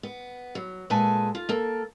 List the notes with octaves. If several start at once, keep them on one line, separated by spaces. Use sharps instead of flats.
B3
F#3
A#2 G#3 A4 B4 G#5 A5
F4
A#3 A4